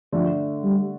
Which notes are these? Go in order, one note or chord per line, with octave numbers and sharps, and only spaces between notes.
D3 F3 A3 D4
G3